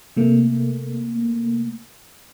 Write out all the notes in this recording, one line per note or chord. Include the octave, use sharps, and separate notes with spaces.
C3 A3 A#3